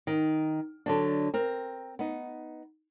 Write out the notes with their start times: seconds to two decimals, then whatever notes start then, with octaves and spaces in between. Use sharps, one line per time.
0.07 D#3
0.86 D3 F#3 D4
1.34 C4 A#4
1.99 B3 D#4